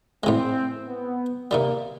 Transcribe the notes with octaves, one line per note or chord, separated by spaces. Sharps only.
A2 E3 G#3 C4
B3
C3 D#3 G3 A#3